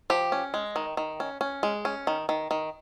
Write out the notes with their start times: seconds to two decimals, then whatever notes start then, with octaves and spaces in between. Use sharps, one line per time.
0.10 F3 G4
0.32 C#4
0.54 G#3
0.76 D#3
0.97 D#3
1.20 C#4
1.41 C#4
1.63 G#3
1.85 C#4
2.07 D#3
2.29 D#3
2.51 D#3